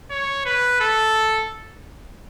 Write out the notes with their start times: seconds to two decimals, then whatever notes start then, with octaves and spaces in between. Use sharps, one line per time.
0.10 C#5
0.45 B4
0.81 A4